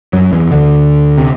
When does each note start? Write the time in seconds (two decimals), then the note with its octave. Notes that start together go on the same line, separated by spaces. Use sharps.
0.13 F#2 F#3
0.32 E2 E3
0.51 D2 D3
1.18 C3